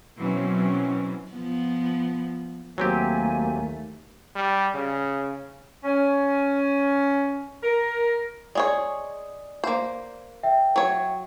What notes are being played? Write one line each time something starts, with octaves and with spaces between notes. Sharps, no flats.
B2 E3 F#3 C4 C#4
F3 B3
D#2 F#3 A3 A#3 C4 G4 G#5
G3
C#3
C#4
A#4
G#3 G#4 C#5 D5
A#3 C5
E5 G5
F#3 C#5